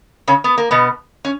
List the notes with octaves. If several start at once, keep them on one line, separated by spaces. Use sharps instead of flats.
C#3 C#4
B3
A#3
B2 B3
C#4